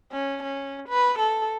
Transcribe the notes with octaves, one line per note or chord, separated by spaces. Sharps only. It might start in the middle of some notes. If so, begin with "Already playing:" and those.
C#4
C#4
B4
A4